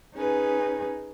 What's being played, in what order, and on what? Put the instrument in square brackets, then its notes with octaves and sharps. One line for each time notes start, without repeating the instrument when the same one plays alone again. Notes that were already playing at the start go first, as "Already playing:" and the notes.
[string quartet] C#4 D#4 G#4 B4 G#5